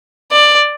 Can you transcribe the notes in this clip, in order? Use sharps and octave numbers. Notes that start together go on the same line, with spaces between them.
D5